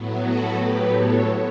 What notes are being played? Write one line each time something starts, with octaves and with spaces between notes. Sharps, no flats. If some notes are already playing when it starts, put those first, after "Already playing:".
Already playing: A2 F#3 B3
F#4 A4
A2 F#3 B3 G4 B4
A4 C#5